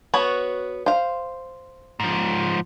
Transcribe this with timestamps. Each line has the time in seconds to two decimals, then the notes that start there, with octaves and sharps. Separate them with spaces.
0.14 B3 F#4 C#5
0.86 C5 F5
2.00 G#2 F3